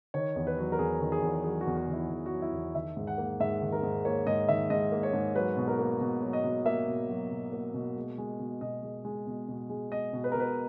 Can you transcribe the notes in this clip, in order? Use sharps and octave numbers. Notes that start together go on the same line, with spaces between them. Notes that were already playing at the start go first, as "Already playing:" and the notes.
D#3 C#5
E2
B4
F#3
A#4
E2 G#4
D#3
G#4
E2
F#3 G#4
F#4
E2
F#4
D#3
E4
E2
F#4
F#3
E4
E2
D#3 E5
G#2
F#5
A#3
G#2 E5
D#3
A#4
G#2
A#3 C#5
G#2 D#5
D#3 E5
G#2 D#5
A#3
C#5
G#2
F#3 B4
B2
A#4
A#3
B2
F#3
D#5
B2
A#3 E5
B2
F#3
B2
A#3
B2
G#3
G#3
B2
B2 D#5
G#3
G#3
B2
B2
G#3
G#3 D#5
B2
B4
B2 A#4
B4